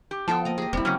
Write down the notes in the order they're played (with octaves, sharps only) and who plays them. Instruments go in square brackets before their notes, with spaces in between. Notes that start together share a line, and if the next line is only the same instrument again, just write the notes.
[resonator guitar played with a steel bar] G4
[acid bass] F3 [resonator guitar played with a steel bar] B3 A5 [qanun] F4 A4 G5
[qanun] A#3 D#5
[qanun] G4 D#5 [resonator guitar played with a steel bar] G#4
[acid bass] E1 [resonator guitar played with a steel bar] G3 [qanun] C4 E4
[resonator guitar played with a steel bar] C#3 A#3 C#4 [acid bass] F#3